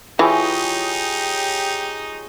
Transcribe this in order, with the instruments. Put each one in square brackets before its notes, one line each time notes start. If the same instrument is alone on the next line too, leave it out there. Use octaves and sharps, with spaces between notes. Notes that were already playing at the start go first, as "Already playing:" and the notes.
[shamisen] E3 [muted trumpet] D#4 [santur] F4 G#4 C#5 [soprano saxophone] G4